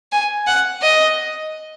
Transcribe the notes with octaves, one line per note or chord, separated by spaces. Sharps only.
G#5
F#5
D#5